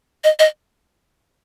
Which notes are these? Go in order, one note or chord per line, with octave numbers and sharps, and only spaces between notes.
D#5
D#5